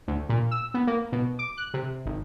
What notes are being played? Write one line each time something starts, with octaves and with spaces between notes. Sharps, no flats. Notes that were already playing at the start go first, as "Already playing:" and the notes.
D2
A#2
E6
B3
A#3
B2
D6
F#6
C3
G#1